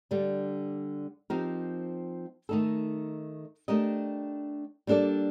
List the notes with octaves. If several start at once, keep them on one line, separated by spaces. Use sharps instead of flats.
D3 G3 D4
F3 C4 D#4 G4 A#4
D#3 A3 D#4 A4
A3 D4 G4 A#4 D#5
G3 A#3 D4 A4 D5